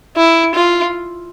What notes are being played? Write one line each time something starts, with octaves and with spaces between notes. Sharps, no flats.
E4
F4